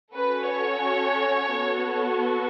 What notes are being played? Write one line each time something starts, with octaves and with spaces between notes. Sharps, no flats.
C#4 F#4 A4 B4
C#5
B3 F#4 A4